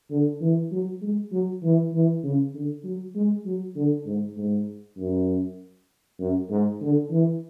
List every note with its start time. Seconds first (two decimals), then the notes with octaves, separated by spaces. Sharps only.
0.11 D3
0.41 E3
0.72 F#3
1.02 G#3
1.32 F#3
1.63 E3
1.93 E3
2.23 C#3
2.54 D3
2.84 F#3
3.15 G#3
3.46 F#3
3.76 D3
4.06 G#2
4.37 G#2
4.98 F#2
6.20 F#2
6.50 G#2
6.81 D3
7.10 E3